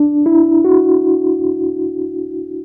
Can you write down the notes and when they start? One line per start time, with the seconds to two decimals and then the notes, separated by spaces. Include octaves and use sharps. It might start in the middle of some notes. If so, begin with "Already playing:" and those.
Already playing: D4
0.26 E4
0.65 F#4